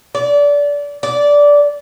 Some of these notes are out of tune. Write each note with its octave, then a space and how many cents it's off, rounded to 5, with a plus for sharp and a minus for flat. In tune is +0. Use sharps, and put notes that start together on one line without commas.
D5 -25
D5 -15